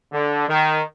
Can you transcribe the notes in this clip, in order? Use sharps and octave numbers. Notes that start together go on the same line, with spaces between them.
D3
D#3